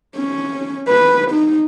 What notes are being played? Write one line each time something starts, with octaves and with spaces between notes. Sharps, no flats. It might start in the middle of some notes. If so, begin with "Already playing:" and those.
C#4
B4
D#4